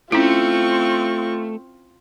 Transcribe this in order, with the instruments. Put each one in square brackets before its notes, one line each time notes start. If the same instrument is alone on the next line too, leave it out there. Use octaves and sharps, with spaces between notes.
[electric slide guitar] A3 [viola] C4 C#6 [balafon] C#4 E4 [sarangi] F4